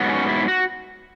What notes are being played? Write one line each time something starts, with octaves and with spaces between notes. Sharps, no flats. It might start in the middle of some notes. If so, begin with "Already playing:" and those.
Already playing: G#2 F#3 B3
C#4
E4
F#4